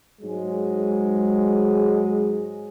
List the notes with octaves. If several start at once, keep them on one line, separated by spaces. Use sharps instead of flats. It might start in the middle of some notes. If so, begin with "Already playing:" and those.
G#2 F#3 G#3